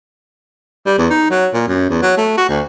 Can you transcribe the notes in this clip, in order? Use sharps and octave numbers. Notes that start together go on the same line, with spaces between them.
G3
E2
D#4
F#3
A#2
F#2
E2
F#3
A3
F#4
D2